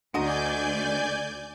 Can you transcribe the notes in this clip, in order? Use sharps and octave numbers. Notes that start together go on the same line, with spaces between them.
D2 D4 F#4 D5 D#5 G#5 A#5 G6